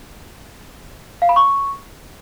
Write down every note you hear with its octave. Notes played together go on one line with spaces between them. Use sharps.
F5
B5
C#6